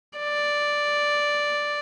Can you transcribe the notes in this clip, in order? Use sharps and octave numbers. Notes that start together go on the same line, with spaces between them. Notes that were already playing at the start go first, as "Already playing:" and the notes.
D5